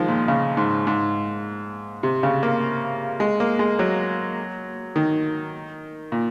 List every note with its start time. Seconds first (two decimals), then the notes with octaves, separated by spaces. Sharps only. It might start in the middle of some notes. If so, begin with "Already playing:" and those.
Already playing: D#3 F3 G#3
0.08 A#2
0.28 C#3
0.57 G#2
0.87 G#2
2.03 C3
2.23 C#3
2.43 A#3
3.20 G#3
3.40 A#3
3.59 G#3
3.79 F#3
4.96 D#3
6.12 A#2